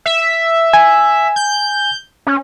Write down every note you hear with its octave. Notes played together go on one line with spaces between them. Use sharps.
E5
G#5
G6
C#4